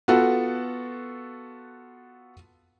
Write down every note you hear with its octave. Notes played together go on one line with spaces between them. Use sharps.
B3 F4 F#4 A4 F#5